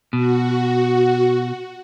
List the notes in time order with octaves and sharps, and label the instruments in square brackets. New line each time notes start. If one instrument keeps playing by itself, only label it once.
[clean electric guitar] B2 [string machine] F#4